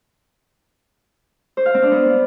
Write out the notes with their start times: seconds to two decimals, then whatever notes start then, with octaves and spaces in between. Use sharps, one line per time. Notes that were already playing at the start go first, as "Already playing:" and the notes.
1.57 C5
1.66 F5
1.74 C4
1.83 D4
1.91 B3